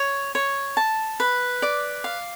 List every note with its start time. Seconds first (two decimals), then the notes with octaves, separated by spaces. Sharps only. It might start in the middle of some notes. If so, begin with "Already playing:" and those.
Already playing: C#5
0.35 C#5
0.77 A5
1.20 B4
1.62 D5
2.04 F5